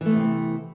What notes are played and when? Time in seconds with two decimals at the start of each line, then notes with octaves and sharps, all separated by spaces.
0.01 E3
0.06 A3
0.10 B3
0.15 C3
0.20 C4